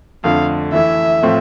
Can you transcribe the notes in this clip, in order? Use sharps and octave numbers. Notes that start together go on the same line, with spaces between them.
F2 D3 A3 F5
E3 A3 E4 E5
A2 F3 A3 C4 F4